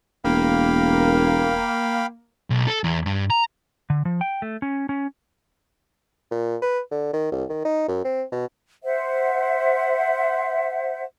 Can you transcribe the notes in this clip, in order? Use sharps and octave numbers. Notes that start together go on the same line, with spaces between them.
E1 A#3 F5 G5 B5
B1
A4
E2
G2
A#5
D3
F3
G5
A3
C#4
C#4
A#2
B4
D3
D#3
C2
D#3
D#4
F#2
C4
B2
C5 E5 F#5